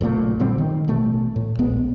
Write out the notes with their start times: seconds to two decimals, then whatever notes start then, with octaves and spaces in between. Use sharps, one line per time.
0.01 F#1 B1 A#2 A3
0.39 A#2 D3 G3 C4
0.58 D#3
0.88 A1 B2 A3
1.36 A2
1.59 D1 A#1 G#3 B3